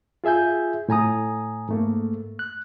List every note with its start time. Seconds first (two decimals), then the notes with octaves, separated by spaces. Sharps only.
0.24 F4 G#4 E5 G#5 G6
0.89 A2 G#5 A#5 D#6
1.69 G#2 A3 A#3
2.39 F#6